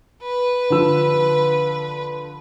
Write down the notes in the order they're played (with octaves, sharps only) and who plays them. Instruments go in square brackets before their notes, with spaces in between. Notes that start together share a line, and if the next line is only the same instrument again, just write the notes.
[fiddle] B4
[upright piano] D3 F3 E6